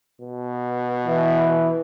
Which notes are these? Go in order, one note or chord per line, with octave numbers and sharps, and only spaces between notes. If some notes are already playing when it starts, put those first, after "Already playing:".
B2
E3